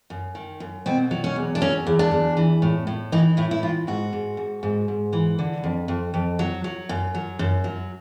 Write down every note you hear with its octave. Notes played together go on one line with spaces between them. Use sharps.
F#2
D#3
F#2
B2 C4
F#3
C#4
E2
D4
F#3 C#4
E2
D4
E2
E3
A2
A2
E3 D#4
A2 E4
E4
E3 F4
G#2 F#4
G#2
G#2
G#2
G#2
E3
D3
F2
F2
F2
F#3
F#3
F#2
F#3
F#2
F#3